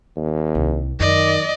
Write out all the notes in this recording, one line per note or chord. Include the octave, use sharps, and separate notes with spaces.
D#2
C2
F#2 D#3 D5 D#5